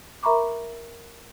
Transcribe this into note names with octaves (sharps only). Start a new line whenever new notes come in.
A#4 E5 A#5 B5 C#6 D6